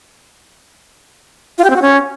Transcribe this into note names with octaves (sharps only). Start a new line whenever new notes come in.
F4
G4
C4
F#4
C#4